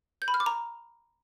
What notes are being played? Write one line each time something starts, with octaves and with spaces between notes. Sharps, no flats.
G6
B5
F6
D6
A#5